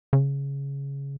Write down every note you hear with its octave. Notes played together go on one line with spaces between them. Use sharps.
C#3